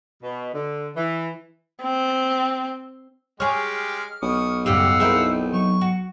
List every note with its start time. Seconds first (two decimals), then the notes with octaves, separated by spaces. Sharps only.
0.23 B2
0.55 D3
0.96 E3
1.82 C4
3.40 G#3 G4 G#4 C#5 F6
4.22 B1 C#6 D#6
4.66 F#2 A2 C#3 G3 G4 F5 F#5 E6
5.00 C4 D#4 E4 G#4 A#4
5.54 F#3 C#6
5.81 F#4